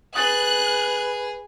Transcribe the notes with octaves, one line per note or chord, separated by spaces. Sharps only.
G#4 B4 D#6 F#6 A6